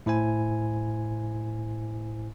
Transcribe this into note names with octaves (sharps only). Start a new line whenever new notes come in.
A2 E4 C5 G#5